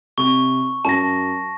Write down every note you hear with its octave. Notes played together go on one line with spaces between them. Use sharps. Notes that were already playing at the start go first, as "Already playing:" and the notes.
C3 C#6
F#2 A5 A#6